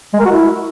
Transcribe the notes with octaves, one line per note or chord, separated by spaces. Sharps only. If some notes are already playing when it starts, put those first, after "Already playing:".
G#3
A#4
F#4
E4